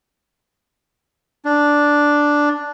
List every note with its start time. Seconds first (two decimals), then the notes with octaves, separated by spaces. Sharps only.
1.45 D4